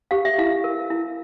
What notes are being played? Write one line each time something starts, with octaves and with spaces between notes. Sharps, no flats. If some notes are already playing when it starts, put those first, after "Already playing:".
G4 F5
E5
E4 F5
A#4
E4